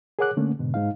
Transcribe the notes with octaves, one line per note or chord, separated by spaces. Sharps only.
G#4 A#4 C#5 F#5 D6 F#6
D3 A3 A#3 C#4
G#2 B2 D3
G#2 D#4 F5